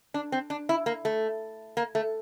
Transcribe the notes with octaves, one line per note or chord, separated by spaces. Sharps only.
D4
C4
D4
E4
A#3
A3
A#3
A3